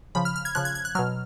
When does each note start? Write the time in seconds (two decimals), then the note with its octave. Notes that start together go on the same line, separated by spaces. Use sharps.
0.15 C#3 F3 B5
0.25 F6
0.36 F6
0.45 G#6
0.55 C#3 F3 F#6
0.65 G#6
0.75 G#6
0.85 F#6
0.95 B2 F#3 F6